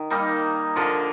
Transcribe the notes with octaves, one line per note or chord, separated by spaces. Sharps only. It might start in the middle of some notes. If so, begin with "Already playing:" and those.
Already playing: D#3
G3 A#3 D#4
D3 F3 A#3